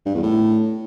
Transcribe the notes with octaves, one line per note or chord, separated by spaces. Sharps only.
G2
E2
A2